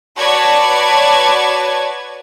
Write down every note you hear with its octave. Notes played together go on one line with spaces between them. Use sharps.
F#4 B4 C#5 D5 A5 G#6